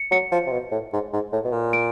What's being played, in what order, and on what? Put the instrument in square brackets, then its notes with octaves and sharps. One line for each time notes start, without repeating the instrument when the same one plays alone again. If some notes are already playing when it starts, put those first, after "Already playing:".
Already playing: [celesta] C#7
[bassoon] F#3 [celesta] C#7
[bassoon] F3
C3
B2
A2
G#2
G#2
A2
B2
A#2
[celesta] D7